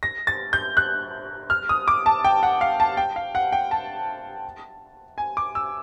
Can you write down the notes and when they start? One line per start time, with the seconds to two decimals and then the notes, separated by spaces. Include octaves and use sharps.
0.03 A#6
0.27 A6
0.53 G6
0.77 F#6
1.50 F6
1.69 D#6
1.88 D6
2.06 A5
2.25 G5
2.43 F#5
2.61 F5
2.80 A5
2.97 G5
3.16 F5
3.35 F#5
3.52 G5
3.71 A5
5.18 G#5
5.37 D6
5.55 E6